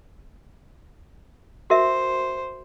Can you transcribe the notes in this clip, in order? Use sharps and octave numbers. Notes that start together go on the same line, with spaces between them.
F#4 A#4 C5 E5